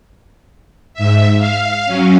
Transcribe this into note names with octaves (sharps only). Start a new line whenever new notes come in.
G#2 E5
F5
F#3 C#4